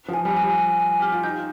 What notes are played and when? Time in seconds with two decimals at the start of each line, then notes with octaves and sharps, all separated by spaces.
0.08 F3
0.13 G#5
0.25 G3
0.37 G3 G#5
0.58 G#5
0.80 G#5
0.99 G4 F6
1.12 F4
1.23 D#4 G6